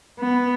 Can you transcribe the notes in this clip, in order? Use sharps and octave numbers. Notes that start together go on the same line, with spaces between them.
B3